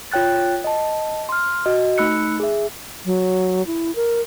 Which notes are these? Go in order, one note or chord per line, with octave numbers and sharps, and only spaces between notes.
F4 C#5 G5 F#6 A6
D#5 A5
C6 F6
F#4 D#5
A3 D#4 B5 E6 F#6 C#7
G#4 E5
F#3
E4
A#4